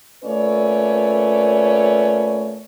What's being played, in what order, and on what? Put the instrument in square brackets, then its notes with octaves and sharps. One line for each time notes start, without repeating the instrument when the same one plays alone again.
[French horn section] A#2 A3 C#4 B4 C#5 D5